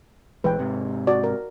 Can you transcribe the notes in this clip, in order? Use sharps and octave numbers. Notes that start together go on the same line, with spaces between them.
A#1 E3 G#3 B4 G5
G#2 C3
F#4 D5
A#4